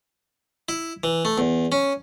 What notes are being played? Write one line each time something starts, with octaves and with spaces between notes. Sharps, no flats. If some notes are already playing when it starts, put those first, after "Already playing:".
E4
E3
A3
E2
C#4